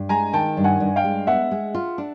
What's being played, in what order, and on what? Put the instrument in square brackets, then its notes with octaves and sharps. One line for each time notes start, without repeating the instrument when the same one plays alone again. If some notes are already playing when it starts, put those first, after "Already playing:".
Already playing: [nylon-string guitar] G2
[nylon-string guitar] G#3 [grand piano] G#5 A#5
[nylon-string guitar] D#3 [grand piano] G5 A5
[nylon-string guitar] G2
[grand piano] F#5 G#5
[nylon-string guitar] G2
[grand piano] F5 G5
[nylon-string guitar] G#3
[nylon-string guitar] B3 [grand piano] E5 F#5
[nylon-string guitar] G#3
F4
D4